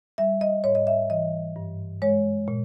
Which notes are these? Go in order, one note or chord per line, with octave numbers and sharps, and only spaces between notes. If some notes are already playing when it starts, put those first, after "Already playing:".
G3 E5
D#5
G#2 C#5
D#5
E5
E3 D#5
G2
G#3 C#5
A#2